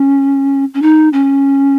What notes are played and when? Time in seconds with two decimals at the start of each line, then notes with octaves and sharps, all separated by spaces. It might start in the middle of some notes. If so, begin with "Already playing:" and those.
Already playing: C#4
0.74 C#4
0.82 D#4
1.13 C#4